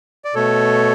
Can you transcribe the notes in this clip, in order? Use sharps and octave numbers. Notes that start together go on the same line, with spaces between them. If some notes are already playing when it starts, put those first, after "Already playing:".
D5
B2 A3 A4 C#5